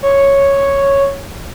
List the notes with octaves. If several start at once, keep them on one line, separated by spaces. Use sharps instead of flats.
C#5